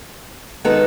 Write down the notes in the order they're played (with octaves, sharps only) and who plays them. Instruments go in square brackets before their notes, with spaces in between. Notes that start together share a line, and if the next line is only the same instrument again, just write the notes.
[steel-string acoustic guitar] D#3 G#3 B3 D#4 A4